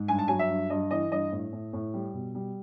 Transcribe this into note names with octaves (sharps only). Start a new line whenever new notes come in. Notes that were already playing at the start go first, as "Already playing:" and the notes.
Already playing: G#2
G2 G#5
A5
F#3 G#5
E5
G2
G2 D#5
E3 D#5
G2 D#5
A2
A2
A2
G3
B2
G3